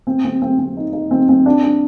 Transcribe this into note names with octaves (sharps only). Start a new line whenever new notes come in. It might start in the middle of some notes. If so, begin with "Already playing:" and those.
C4
C4
C4
C4
D#4
D#4
C4
C4
D4
D4